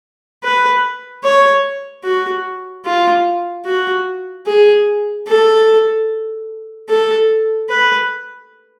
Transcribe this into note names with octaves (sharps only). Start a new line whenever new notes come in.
B4
C#5
F#4
F4
F#4
G#4
A4
A4
B4